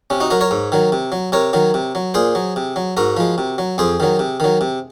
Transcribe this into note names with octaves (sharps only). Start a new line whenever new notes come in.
C3 C#4
D#4 F#4
F#3 F#4 A#4
A#4 C#5
G#2
D#3 F#3
C3
F#3
C3 A#4 C#5
D#3 F#3
C3
F#3
A#2 G#4 C5
F#3
C3
F#3
G#2 F#4 A#4
F3 G#3
C3
F#3
F2 G#4 C5
D#3 F#3
C3
D#3 F#3
C3